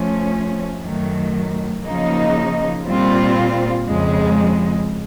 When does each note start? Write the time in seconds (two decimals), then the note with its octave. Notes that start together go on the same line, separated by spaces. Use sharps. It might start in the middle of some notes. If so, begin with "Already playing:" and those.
Already playing: F3 A3 C#4
0.82 F#2 D#3 F#3 A3
1.83 C#3 F3 A#3 D#4
2.86 A#2 G3 C4 F4
3.87 F2 C#3 F3 G#3